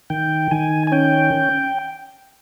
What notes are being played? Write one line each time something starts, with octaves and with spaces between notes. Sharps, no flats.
D#3 G5
D#3 G#5
G#5
C#4 G5